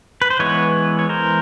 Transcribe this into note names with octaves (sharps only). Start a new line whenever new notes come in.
B4
C5
E3 G#3 B3 B4 C#5
C#5
A#4 C5